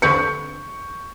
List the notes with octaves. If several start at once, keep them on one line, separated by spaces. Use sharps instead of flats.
D3 C4 B4 C#6 G6 C#7